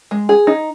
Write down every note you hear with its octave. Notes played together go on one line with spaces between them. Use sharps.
G#3
G#4
D#4